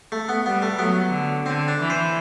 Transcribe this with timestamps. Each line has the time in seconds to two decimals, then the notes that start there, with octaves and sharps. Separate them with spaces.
0.12 A3
0.29 B3
0.45 G3 B3
0.62 A3
0.79 F#3 B3
1.12 D3
1.46 D3 C4
1.68 D4
1.79 E3
1.90 C5